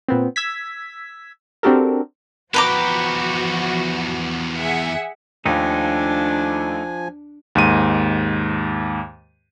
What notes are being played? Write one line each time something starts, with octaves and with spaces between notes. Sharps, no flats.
A#2 B3 C4
E6 G#6 B6
C4 D4 F#4 G4 A4 A#4
E2 F3 F#4 G4 B4 A#5 D6
G#4 E5 F#5
D#2 F3 A3 D4 D#4 G#5
D#2 G#2 D#7